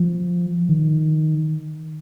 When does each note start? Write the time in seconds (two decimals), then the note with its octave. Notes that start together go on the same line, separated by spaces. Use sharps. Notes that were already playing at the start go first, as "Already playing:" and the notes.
Already playing: F3
0.69 D#3